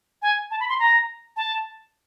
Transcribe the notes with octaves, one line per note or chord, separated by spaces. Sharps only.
G#5
A5
B5
C6
A#5
A5